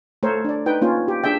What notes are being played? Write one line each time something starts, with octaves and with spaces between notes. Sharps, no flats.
A3 A4 A#4 C5 C#5
D4 D5
D#4 B4 G5
A#3 C#4 F4
G4
D4 G#4 E5 G5